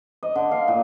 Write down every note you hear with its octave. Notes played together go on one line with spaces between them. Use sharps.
D#5
D3
F5
A#2